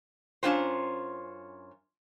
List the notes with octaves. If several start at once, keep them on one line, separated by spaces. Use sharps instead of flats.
F#2 C#4 D4 F4 G4 C5